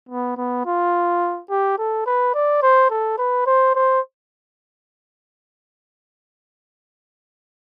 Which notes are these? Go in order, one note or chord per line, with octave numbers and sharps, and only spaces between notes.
B3
B3
F4
G4
A4
B4
D5
C5
A4
B4
C5
C5